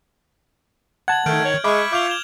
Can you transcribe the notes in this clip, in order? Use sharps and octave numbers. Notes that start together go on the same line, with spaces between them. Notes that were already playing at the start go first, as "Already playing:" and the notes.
F#5 A5 G#6 F#7
D#3 A3 F6 G6 D7
C#5
G#3 E5 B5 C#6 D6
F4 D6 G6 F7 G7
G#6 E7 G7